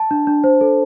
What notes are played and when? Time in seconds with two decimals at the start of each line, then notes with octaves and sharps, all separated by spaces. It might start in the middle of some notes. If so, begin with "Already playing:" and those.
Already playing: A5
0.11 D4
0.27 D4
0.44 C5
0.61 A4